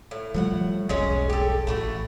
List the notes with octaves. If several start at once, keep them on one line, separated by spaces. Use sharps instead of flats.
A2
A2 F3 G3 A3 G#4 F#5
E1 B1 G#3 C#4 G#4
G4 A4
A1 A3 E4 F#4